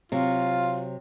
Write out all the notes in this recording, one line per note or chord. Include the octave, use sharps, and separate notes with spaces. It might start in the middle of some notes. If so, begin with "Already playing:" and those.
C3 F#3 F4